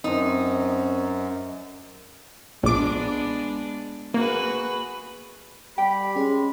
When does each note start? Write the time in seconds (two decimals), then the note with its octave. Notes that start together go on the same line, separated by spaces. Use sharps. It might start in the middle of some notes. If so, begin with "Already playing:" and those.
0.04 F#2 C4 D#4 C5
2.63 A#1 G#3 B3 D4 D6
4.14 A#3 F#4 G#4 B4
5.78 G3 G4 G5 B5
6.16 G#3 C#4 G#4 C#5